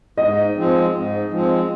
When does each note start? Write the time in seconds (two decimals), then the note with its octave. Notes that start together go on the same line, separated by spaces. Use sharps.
0.17 G#2 D#5
0.56 F3 G#3 C4
0.93 G#2
1.31 F3 G#3 C4